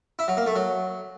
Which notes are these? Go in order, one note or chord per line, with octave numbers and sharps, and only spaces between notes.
E4
F#3
A#3
A3
F#3